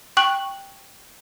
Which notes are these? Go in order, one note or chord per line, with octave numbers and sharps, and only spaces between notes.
G5 C#6 F#6 F#7